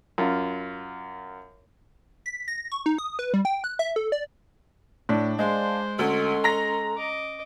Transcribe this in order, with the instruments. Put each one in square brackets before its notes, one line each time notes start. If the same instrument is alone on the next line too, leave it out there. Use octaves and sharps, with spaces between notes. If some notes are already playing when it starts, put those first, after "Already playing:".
[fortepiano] F#2 F4
[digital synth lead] B6
A#6
C#6
D#4
D#6
B4
G3
G5
F#6
E5
A4
D5
[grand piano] A2 [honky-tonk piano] D4
[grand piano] G#3 [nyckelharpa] C5 [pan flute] F5
[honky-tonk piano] D2 [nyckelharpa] C#4 C6 [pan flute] A4
[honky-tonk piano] A#5 A#6
[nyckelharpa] D#5 D6